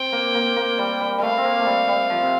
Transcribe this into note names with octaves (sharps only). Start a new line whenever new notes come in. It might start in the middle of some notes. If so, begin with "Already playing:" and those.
Already playing: C4 G5
A#3
A#3
A#3
G3
G3
G3 A3 F5
C4
A#3
A3
G3
G3
F3
C3